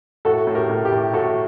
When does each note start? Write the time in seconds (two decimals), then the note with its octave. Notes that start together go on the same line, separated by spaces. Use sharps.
0.25 A2 F#4 A4
0.47 A2
0.55 G4 A#4
0.69 A2
0.85 G4
0.92 A2
1.13 A2 F#4 A4